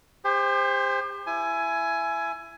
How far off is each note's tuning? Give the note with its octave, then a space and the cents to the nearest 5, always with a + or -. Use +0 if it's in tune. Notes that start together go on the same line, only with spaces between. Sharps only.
G4 +40 C5 +0
E4 +20 G#5 +15